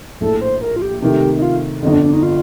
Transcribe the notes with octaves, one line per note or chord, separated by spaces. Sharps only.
A#1 A2 A3 A4
C5
A#4
F4
G4
C3 D#3 A3 G4
D#4
F4
G1 F2 D3 D#4
D4
D4
D#4
F4